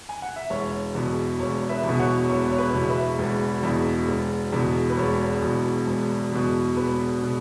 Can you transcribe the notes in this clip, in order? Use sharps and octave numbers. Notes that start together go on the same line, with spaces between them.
G#5
F#5
E5
E1 C#5
E2 B2
E1 C#5
B4 E5
E2
B2
C#5 F#5
E1 C#5
C#5
B4
E2 B2
B4 E5
E1
E2 B2
E1
E2 B2
B4
E1 C#5
E2 B2
E1
E2 B2
E1 B4
B2